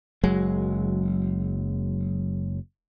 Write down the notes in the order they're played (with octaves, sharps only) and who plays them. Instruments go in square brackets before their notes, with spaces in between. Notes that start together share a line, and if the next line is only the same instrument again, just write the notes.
[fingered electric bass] F#1 F#3 G#3